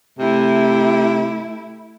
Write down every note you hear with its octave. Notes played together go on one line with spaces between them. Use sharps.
C3 A3 E4